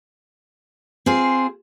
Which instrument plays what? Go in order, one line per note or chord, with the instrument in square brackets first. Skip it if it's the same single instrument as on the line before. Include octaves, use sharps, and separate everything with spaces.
[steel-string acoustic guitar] C4 F4 G#4 C5